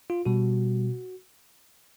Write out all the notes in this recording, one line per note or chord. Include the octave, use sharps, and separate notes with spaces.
F4
B2 G3 F#4